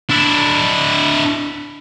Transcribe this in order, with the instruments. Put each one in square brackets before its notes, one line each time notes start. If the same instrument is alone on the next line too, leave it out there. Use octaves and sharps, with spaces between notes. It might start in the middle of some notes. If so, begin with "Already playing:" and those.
[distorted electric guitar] D4 E4